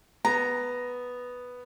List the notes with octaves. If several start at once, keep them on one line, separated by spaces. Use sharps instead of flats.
B3 A#5